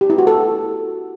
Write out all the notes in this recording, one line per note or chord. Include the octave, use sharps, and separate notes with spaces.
G4
E4
F#4
A4